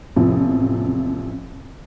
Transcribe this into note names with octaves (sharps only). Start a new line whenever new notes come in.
A1 E2 C3 F3